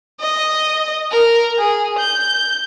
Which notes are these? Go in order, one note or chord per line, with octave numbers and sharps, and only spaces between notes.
D#5
A#4
G#4
G6